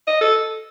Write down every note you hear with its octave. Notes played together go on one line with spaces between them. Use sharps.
D#5
A4